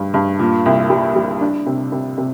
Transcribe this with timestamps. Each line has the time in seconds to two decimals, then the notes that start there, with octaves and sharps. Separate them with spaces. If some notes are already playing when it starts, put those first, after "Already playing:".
Already playing: G2
0.14 G2
0.39 A#2
0.66 C2
0.90 G3
1.16 G3
1.41 D4
1.66 C3
1.92 C3
2.18 C3